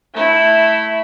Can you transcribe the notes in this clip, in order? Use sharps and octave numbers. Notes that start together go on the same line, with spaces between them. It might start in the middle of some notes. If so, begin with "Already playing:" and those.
A3 E4